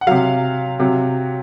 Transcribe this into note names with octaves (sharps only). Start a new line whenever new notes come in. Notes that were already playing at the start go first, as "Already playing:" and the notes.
F#5
C3 F#3 F5
C3 F#3